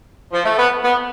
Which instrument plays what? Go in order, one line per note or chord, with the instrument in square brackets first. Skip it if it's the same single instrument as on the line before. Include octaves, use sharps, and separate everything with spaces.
[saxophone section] F3
A3
B3
B3